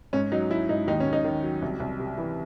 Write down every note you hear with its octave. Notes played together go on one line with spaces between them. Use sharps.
G#2 C#4
F#3 D#4
F#3 E4
G#2 D#4
D#2 D#4
C#4
D#2
D#4
D#3
F#3
C2
C2
C3
E3